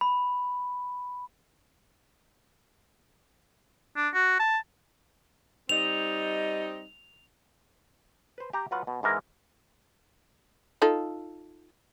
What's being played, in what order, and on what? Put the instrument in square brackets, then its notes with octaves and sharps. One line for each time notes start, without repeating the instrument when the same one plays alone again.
[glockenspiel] B5
[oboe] D4
F#4
A5
[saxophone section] G3 C4 D#4 [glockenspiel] F7
[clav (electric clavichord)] B4 C5
G4 G5 A#5
F#3 F4 B4 F#5
B2
G#2 E3 G#3 A#4
[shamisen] D#4 F4 A4